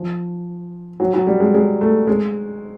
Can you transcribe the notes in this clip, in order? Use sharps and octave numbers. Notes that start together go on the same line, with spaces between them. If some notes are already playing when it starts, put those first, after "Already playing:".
Already playing: F3
F#3
F#3
G3
G#3
G#3
A3
G#3